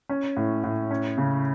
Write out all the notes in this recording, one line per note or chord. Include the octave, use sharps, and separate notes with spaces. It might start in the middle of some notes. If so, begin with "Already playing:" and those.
C#4
A2
A2
C#4
C#3